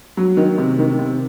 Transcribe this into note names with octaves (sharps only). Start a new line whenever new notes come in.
F#3
D#3
C3
D#3
C3